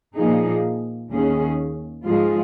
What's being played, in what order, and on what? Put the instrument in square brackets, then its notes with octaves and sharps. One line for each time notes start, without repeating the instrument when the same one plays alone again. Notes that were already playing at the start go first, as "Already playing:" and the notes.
[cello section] A#2 F3 A#3 D#4 G#4
D#2 D#3 C#4 G#4
G#2 F3 G#3 F4 G#4